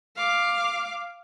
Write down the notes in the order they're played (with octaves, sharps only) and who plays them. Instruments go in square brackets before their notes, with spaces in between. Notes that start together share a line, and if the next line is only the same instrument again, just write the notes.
[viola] F5 D6